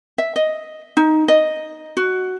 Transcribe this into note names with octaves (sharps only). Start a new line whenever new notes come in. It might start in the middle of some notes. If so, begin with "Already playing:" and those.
E5
D#5
D#4
D#5
F#4